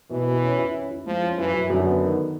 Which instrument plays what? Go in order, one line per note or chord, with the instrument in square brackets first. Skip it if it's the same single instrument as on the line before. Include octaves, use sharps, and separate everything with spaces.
[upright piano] B2 [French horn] E3
[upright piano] B2
C#4
E4
C#4
E4
[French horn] F3 [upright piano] G#3
[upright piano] C#4
[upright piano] F#2 [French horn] E3
[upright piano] F#2
[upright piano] F#2 [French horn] D3
[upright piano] B3
D#3